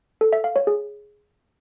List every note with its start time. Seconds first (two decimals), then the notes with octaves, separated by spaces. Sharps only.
0.21 A4
0.33 E5
0.44 F5
0.56 C#5
0.67 G#4